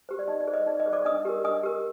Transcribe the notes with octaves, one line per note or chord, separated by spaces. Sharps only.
G4 C5
D5
D#4 D#5
D5
G#4 C5
D#5
D#4 D5
D#5
G#4 C5
D5 D6
D4 D#5 D#6
G4 A#4
D4 D#5 D#6
G4 A#4